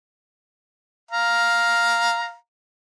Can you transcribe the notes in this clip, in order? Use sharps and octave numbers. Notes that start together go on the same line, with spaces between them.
F5 A#5